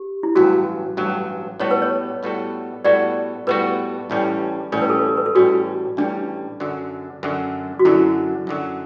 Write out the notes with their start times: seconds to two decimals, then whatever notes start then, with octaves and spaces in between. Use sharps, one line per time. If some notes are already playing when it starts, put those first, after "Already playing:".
Already playing: G4
0.23 E4
0.35 A1 G2 F#3 F#4
0.97 A1 G2 F#3
1.60 A2 G3 B3 F#4 A4 C#5
1.71 B4
1.82 C#5
2.23 A2 G3 B3 F#4 A4
2.84 A2 G3 B3 F#4 A4 D5
3.47 A2 G3 B3 F#4 A4 B4
4.10 A1 A2 G3 C#4
4.72 A1 A2 G3 C#4 A4
4.82 B4
4.90 A4
4.99 B4
5.08 A4
5.17 B4
5.26 A4
5.35 A1 A2 G3 C#4 F#4
5.97 A1 A2 G3 C#4 D4
6.60 F#2 D3 F#3
7.23 F#2 D3 F#3
7.79 F#4
7.85 F#2 D3 F#3 E4
8.47 F#2 D3 F#3